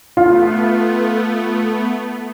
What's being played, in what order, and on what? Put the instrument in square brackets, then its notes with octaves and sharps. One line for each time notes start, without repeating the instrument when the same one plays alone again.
[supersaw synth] A3 B3 [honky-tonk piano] F4